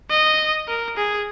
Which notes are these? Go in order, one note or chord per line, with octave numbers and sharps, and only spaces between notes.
D#5
A#4
G#4